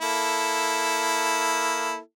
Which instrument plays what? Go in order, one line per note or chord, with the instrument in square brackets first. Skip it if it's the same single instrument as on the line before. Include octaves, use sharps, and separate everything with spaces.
[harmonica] A#3 E4 A4